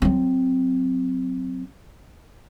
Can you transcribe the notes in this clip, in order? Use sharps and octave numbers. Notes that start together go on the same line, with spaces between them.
F#3 C4